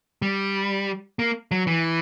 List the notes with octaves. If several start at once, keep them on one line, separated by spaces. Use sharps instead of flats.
G3
A#3
F#3
E3